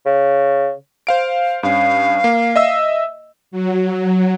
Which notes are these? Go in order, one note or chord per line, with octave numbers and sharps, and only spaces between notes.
C#3
C5 F5 D7
G2 C#4 F5
A#3
D#5 E5 E6
F#3